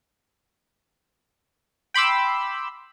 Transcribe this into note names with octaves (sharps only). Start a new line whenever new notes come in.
G5 B5 C6 D6 E6